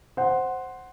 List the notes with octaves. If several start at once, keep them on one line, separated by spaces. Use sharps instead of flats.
C5 F#5